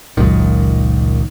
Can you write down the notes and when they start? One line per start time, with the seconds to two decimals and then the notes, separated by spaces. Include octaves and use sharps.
0.17 F#1 C#2 A#2 D#3